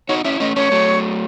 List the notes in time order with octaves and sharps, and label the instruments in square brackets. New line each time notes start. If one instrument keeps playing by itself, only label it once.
[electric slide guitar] D#4 F#4 [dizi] C#5
[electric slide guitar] C#4 E4 [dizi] E5
[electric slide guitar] A3 C#4 [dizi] D#5
[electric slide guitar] A3 C#4 [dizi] C#5
[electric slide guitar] F#3 A3